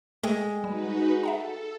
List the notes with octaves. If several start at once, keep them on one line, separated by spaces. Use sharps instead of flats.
G#3 A3 A4 G5
G3 D#4 F#4 B4
A4 E5 F#5 A#5